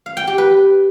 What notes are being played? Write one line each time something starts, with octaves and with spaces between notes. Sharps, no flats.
F5
G5
G4
B4